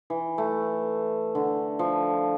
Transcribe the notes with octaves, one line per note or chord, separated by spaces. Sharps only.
E3
A3
D3
F3